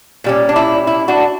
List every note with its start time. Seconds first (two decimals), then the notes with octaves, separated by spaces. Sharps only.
0.24 A#2 G3 C#4
0.49 D4
0.56 E4
0.87 E4
1.08 D4 F#4